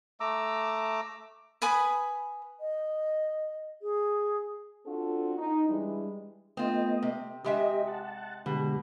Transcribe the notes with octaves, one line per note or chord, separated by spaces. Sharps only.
A3 A#5 D6 E6
B4 G#5 B5 D#6
D#5
G#4
C4 D4 F4 F#4 A4
D#4
E3 G3 G#3 D4 E4
A3 B3 C4 F4 D#5
C3
C3 G#3 G4 D#5 E5
F#5 A5
B2 D3 G#3 G4